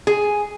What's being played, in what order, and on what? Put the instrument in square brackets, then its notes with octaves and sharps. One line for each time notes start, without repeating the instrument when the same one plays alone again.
[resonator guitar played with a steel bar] G#4